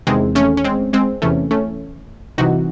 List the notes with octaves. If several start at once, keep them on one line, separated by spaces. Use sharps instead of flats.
E2 C3 D#3 G#3 C4
A3 C#4
C#4
G#3 C4
G#3 C4
E2 C3 E3 A3 C#4
A3 C#4
C2 C3 E3 D#4 F#4